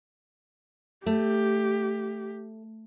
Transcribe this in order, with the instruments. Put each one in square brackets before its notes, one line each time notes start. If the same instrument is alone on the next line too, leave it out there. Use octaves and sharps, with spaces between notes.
[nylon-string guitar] A3 [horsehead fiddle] G4